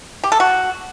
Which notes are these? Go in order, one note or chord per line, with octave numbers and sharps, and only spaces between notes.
G4
A4
F#4